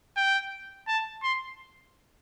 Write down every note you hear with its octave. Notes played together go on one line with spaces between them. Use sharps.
G5
A5
C6